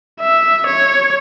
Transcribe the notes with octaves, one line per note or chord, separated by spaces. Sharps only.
E5
C#5